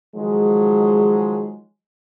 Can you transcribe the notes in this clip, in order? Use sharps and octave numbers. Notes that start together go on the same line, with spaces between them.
D#3 F3 F#3 G#3